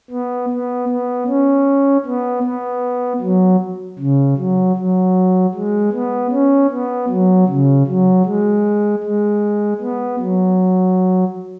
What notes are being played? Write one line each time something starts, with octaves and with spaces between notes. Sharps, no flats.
B3
B3
B3
C#4
B3
B3
F#3
C#3
F#3
F#3
G#3
B3
C#4
B3
F#3
C#3
F#3
G#3
G#3
B3
F#3